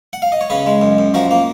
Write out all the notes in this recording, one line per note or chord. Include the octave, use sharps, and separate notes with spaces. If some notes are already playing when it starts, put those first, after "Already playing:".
F#5
F5
D#5
C#5
C#3 G#4 B4
G#3
F#2
F#2
F3 F#4 A#4
A#3